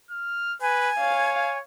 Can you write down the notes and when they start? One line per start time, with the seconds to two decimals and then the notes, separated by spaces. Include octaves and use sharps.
0.11 F6
0.61 B4 G#5
0.99 C#5 F5